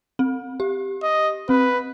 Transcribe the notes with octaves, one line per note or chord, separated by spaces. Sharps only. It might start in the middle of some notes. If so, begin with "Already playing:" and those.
C4
G4
D#5
C4 B4